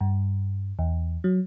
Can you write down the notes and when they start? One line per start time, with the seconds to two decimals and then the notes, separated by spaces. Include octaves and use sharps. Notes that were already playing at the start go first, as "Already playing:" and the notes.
0.01 G2
0.79 E2
1.24 F#3